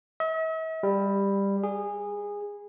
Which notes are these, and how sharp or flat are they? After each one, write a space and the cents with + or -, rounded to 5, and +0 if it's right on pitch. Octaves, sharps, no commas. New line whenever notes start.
E5 -45
G3 +15
G#4 -20